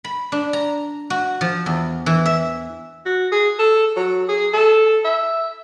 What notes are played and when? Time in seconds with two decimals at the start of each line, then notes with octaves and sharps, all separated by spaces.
0.04 B5
0.32 D4
0.53 A#5
1.10 F#4
1.41 F3
1.66 E2
2.06 E3
2.26 E5
3.06 F#4
3.32 G#4
3.59 A4
3.96 F#3
4.28 G#4
4.53 A4
5.05 E5